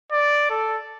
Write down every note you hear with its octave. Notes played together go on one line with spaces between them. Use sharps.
D5
A4